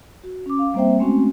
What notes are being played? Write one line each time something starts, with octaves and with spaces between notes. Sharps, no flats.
F#4
C#4 D6
F5
G3 A#3 C4 C5 E5 G5
G#3 A3 C4 C#4 F#4